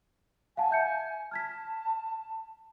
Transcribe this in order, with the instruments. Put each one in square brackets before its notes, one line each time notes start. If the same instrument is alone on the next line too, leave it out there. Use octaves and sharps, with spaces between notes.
[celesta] F5 F#5 A5 [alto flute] G#5
[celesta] E5 G6 C#7
[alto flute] A5 [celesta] F6 G#6 B6